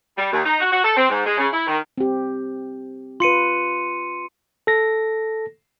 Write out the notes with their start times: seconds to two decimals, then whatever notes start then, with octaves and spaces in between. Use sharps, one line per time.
0.17 G3
0.32 D#2
0.44 D#4
0.60 F#4
0.72 F#4
0.84 A4
0.97 C4
1.09 G#2
1.25 G#3
1.38 C#3
1.52 E4
1.67 D#3
1.98 C4 G4
3.20 F4 B4 C6 C#7 D#7
4.67 A4 A#6